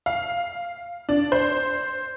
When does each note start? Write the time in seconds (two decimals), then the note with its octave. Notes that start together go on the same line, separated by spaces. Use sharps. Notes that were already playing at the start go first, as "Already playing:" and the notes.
0.06 F5
1.09 D4
1.32 C5